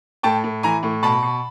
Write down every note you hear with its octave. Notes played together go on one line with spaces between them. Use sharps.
A2 G5 A5
A2
E3 G#5 A#5
A2
B2 A5 B5
B2